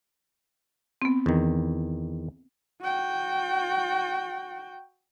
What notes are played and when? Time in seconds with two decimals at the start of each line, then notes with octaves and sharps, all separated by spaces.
1.02 B3 C4
1.26 E2 D#3
2.81 F#4 G5